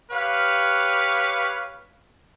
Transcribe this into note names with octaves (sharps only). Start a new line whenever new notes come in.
G4 B4 C#5 F5